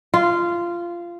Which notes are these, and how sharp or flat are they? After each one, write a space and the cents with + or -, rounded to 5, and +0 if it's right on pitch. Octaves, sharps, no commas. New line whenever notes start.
F4 -15